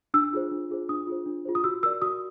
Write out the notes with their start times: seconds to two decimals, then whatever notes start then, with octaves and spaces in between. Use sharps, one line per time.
0.14 D4 E6
0.33 F4 G#4 C5
0.51 D4
0.70 F4 G#4 C5
0.89 D4 D#6
1.07 F4 G#4 C5
1.26 D4
1.45 F4 G#4 C5
1.55 D#6
1.64 F#4 E6
1.83 A#4 D5 E6
2.02 F#4 D#6